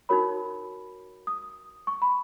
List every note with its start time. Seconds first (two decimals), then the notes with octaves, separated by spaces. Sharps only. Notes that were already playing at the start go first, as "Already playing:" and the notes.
0.09 D#4 F#4 A#4 C#5 B5
1.27 D#6
1.87 C#6
2.02 B5